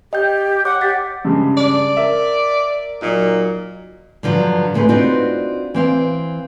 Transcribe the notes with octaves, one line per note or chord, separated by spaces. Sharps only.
G4 D#5 G5 G6
C#5 F#5 D6 F#6
G4 F#5 A6 B6
G2 C#3 G#3
D5
A#4 E5
A#2 F#3 D#4
G2 D3 F3 F#3
D#2 C3 G#3 A3 B4
C4 D4 D#4 F4 F#4 B4
E3 C4 F5